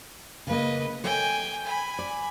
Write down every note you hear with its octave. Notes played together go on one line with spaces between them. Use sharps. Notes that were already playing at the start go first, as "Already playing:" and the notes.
C#3 A#3 B4 D#5
A4 C#5 D#5 G5 G#5
G#5 B5
D5